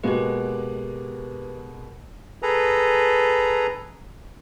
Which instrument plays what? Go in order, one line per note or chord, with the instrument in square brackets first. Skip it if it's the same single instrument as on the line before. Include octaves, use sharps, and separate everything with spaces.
[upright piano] B2 G#3 A#3 [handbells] G4 B4
[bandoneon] G#4 A4 B4 A#5